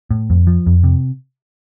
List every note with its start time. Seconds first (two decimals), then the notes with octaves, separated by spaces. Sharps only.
0.10 A2
0.30 F2
0.47 F3
0.66 F2
0.84 C3